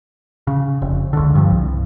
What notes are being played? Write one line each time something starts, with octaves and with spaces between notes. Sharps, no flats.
C#3
F1
C#2 D3
G2 F3
C2